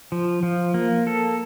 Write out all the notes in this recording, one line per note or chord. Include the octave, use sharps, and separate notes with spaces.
F3
F3
A#3
A4